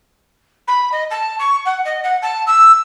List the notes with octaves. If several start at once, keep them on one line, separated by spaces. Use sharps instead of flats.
B5
D#5
A5
C#6
F#5
D#5
F#5
A5
E6